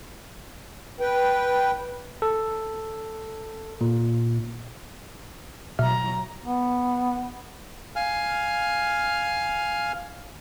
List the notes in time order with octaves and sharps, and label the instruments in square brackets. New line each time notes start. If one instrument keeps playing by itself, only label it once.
[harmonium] B4 G5
[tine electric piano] A4
A#2
[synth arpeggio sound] B2 E5 F6 [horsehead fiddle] F#3 A#5
[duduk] B3
[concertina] F5 G#5 F6